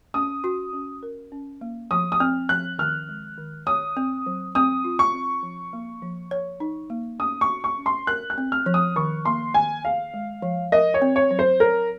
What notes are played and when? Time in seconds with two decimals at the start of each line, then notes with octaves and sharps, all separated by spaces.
0.14 C#4 D#6
0.44 F#4
0.73 C#4
1.03 A#4
1.32 C#4
1.61 A#3
1.91 F3 D#6
2.12 D#6
2.20 C4 F6
2.49 F3 F#6
2.78 D#3 F6
3.09 G#3
3.38 D#3
3.66 C#5 D#6
3.97 C4
4.26 F#3
4.55 C4 D#6
4.84 F4
4.99 C#6
5.14 C4
5.43 F3
5.73 A#3
6.02 F3
6.31 C#5
6.60 D#4
6.90 A#3
7.19 C#4 D#6
7.41 C#6
7.49 F#4
7.64 C#6
7.78 C#4
7.86 C6
8.07 A#4 F#6
8.30 F#6
8.38 C4
8.52 F6
8.66 F3
8.74 D#6
8.96 D#3 C#6
9.25 A#3 C6
9.54 D#3 G#5
9.84 G#4 F5
10.14 G#3
10.42 F3
10.72 A#4 D#5
10.94 C#5
11.02 C4
11.16 C#5
11.31 F#3
11.39 C5
11.60 A#4 C#5